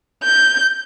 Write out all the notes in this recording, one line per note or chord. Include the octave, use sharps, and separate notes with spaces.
G6